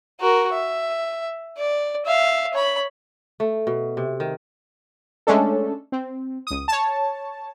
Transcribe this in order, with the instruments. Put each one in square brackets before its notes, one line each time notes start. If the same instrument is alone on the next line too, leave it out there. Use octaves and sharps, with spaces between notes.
[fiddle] F#4 A#4
E5
D5
E5 F5
C#5 B5
[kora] A3
B2
C3
D#3
[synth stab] G#3 A3 C#4 D4 A4
C4
C#2 D#6
C#5 A5